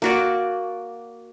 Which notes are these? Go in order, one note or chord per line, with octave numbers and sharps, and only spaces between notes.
A#3 F#4 D5